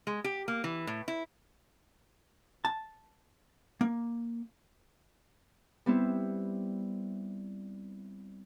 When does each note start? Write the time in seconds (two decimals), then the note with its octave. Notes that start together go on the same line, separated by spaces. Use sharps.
0.07 G#3
0.24 G4
0.48 A#3
0.64 E3
0.87 A2
1.08 E4
2.65 A5
3.81 A#3
5.86 G3 B3 C4 E4